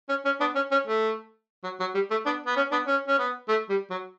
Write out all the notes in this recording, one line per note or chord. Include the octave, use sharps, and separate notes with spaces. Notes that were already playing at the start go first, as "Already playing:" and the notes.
C#4
C#4
B3 D4
C#4
C#4
A3
F#3
F#3
G3
A3
B3 D4
B3
C#4
B3 D4
C#4
C#4
B3
A3
G3
F#3